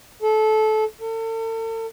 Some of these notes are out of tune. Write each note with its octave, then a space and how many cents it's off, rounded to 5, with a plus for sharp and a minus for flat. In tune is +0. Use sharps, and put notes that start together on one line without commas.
A4 -20
A4 +40